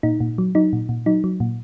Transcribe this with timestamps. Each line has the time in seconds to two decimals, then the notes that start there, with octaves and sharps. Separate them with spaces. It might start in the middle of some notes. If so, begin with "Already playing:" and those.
0.03 A#2 D#4
0.20 A#2
0.38 F#3
0.55 F#3 D#4
0.73 A#2
0.89 A#2
1.06 F#3 D#4
1.24 F#3
1.40 A#2